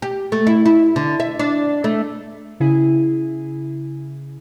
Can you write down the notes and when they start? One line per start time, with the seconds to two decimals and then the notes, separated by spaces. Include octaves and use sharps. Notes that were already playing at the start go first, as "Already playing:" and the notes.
0.02 G4
0.32 A3
0.47 E4
0.66 E4
0.96 D3
1.20 E5
1.39 D4
1.84 A3
2.60 C#3 E4 G#4